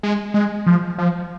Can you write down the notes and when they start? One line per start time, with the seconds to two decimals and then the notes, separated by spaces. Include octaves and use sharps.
0.03 G#3
0.34 G#3
0.67 F3
0.98 F3